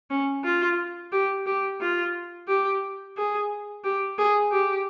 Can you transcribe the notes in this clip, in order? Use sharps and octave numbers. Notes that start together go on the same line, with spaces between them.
C#4
F4
G4
G4
F4
G4
G#4
G4
G#4
G4